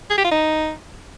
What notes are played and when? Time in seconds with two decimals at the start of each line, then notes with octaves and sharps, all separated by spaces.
0.11 G#4
0.18 G4
0.25 F4
0.32 D#4